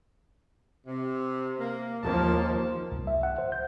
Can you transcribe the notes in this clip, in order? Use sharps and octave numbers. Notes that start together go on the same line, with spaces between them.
C3
A#3
D#2 F3 A#3 A5
C2
E5
F#5
C5
G6